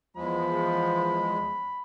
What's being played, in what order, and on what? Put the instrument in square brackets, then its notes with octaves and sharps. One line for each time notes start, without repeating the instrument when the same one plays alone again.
[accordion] E2 G#3 [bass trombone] F3 [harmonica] B5